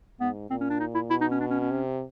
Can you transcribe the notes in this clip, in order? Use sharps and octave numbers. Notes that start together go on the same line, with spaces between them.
G#2 B3
A#2 C4
C#4
D4
D#4
E4
B2 E4
D#4
C#4
D4
C#4
C#4
C3